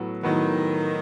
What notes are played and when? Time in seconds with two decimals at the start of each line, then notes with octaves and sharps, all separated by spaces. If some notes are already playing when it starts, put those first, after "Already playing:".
Already playing: A2 F#3 B3
0.23 A2 D#3 F#3 B3